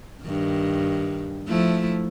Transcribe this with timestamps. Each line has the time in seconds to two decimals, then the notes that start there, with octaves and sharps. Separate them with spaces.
0.23 G2 D#3
1.48 F3 A3 E4